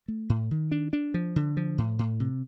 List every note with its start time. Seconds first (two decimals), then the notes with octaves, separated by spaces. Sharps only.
0.08 A3
0.29 A2
0.51 D#3
0.72 D4
0.93 D4
1.14 F3
1.36 D3
1.57 F3
1.78 A2
1.99 A2
2.20 C3